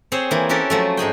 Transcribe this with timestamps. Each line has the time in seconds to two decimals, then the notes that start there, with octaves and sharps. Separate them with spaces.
0.12 C4 G#4 C5 C#5
0.31 E3 A#3
0.49 C#4 E4 F#4 G4 A4 A#4
0.70 F3 F#3 A3
0.97 G#2 D#4 G#4 G5